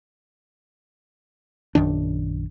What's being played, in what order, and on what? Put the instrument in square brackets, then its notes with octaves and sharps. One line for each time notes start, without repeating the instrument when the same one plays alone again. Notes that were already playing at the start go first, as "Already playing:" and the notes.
[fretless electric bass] A#1 F#2 D#3 D4